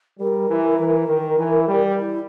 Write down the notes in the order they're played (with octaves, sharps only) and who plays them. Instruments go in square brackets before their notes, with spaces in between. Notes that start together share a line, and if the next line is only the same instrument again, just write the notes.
[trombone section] G3 [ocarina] A#4
[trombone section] E3
E3
D#3
E3
G3
[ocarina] E4